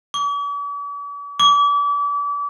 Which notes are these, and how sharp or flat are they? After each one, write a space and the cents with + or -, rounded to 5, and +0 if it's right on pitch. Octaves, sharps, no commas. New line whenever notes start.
D6 -45
D6 -35